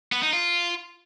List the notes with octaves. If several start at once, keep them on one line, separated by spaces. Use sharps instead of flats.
B3
D#4
F4